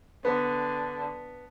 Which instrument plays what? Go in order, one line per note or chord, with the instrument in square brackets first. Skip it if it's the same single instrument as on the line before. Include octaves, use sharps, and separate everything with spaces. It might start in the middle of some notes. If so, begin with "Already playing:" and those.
[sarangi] D3 [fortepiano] B3